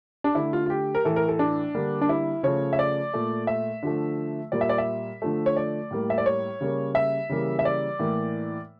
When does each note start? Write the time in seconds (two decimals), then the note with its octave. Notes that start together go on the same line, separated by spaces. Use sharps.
0.24 D4
0.35 D3 A3 E4
0.53 F4
0.66 F4
0.70 G4
0.95 A#4
1.05 A2 E3 A3 A4
1.16 A#4
1.29 A4
1.39 D4
1.75 D3 G3 A#3
2.02 D4
2.09 E4
2.43 C#3 F3 A3 C#5
2.73 E5
2.79 D5
3.14 A#2 A3
3.47 E5
3.83 D3 F3 A3
4.52 A#2 G3 A#3 D5
4.61 E5
4.69 D5
4.78 E5
5.22 D3 F3 A3
5.46 C#5
5.56 D5
5.91 A2 G3 A#3
6.10 E5
6.18 D5
6.26 C#5
6.61 C#3 G3 A#3
6.95 E5
7.29 C#3 E3 G3 A#3
7.59 E5
7.65 D5
7.99 A2 E3 A#3